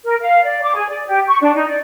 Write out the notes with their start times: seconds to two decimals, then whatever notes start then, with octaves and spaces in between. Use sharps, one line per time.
0.04 A#4
0.21 F5
0.42 D5
0.62 D6
0.75 G#4
0.88 D5
1.07 G4
1.27 C#6
1.41 D4
1.54 D#4
1.68 D5